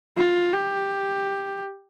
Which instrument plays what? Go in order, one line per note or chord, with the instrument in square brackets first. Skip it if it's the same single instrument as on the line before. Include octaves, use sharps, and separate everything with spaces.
[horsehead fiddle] F4
G4